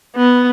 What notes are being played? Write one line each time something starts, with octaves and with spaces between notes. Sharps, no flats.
B3